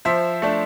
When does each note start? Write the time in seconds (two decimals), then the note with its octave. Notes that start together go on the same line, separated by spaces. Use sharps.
0.05 F3 C5 E5
0.42 A3 D4